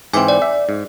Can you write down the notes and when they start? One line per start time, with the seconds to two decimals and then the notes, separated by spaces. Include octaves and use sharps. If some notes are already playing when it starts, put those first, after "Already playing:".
0.13 G#2 E3 C4 G#5 D6
0.28 D5
0.42 E5
0.69 G#2